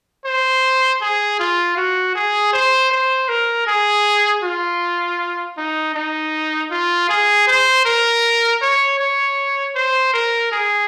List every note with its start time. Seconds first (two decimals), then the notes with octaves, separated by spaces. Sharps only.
0.25 C5
1.01 G#4
1.39 F4
1.77 F#4
2.15 G#4
2.53 C5
2.91 C5
3.29 A#4
3.67 G#4
4.43 F4
5.57 D#4
5.95 D#4
6.71 F4
7.09 G#4
7.47 C5
7.85 A#4
8.61 C#5
8.99 C#5
9.75 C5
10.13 A#4
10.51 G#4